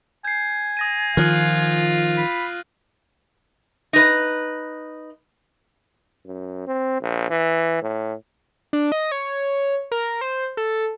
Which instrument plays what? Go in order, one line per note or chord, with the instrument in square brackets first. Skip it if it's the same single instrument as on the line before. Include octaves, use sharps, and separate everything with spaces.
[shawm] G#5 [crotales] G6 C7
[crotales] D#6 A#6 D#7
[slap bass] D#3 F3 [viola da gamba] F4 [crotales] F6 F#6 F#7
[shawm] B5
[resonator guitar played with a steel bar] D#4 B4
[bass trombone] F#2
C4
A#1
E3
A2
[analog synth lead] D4
D#5
C#5
A#4
C5
A4